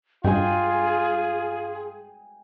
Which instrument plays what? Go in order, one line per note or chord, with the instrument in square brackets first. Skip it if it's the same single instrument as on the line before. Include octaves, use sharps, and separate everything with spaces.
[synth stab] G2 [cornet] F4 [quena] G#4 [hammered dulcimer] G5 G#5